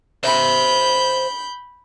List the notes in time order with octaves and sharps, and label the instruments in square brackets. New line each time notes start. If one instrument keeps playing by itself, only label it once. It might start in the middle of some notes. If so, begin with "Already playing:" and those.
[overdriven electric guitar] C5 E5 [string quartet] B5 G6